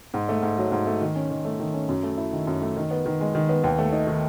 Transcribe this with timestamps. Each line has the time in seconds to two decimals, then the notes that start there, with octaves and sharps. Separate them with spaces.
0.14 G#2
0.29 A3
0.42 G#2
0.58 F#3
0.72 G#2
0.87 A3
1.01 D#3
1.15 C#4
1.31 D#3
1.45 A3
1.60 D#3
1.74 C#4
1.89 F#2
2.03 A3
2.18 E4
2.33 D#3
2.47 F#2
2.62 A3
2.76 D#3
2.91 B3
3.06 D#3
3.21 G#3
3.35 D#3
3.49 B3
3.64 D#2
3.78 A3
3.92 D#4
4.07 D#3